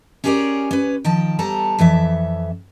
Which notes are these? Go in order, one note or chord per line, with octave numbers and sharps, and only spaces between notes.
C#4 G4 G#4 A#4 C#5 D5
C#4 B4
D#3 F3 G5 A5
G3 B3 A4 A5 A#5
F2 E3 A4 E5